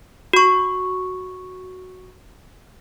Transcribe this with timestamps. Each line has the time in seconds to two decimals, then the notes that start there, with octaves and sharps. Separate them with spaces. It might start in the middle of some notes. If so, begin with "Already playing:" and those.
0.33 F#4 C#6